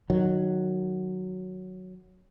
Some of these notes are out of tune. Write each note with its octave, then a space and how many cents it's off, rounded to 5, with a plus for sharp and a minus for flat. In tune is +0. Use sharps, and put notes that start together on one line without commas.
D#3 -20 F#3 +0